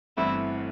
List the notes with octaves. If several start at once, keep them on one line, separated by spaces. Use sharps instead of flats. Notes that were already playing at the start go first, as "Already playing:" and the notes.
G1 G2 E3 A3 C4 E4